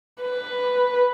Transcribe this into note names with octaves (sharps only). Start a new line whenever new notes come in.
B4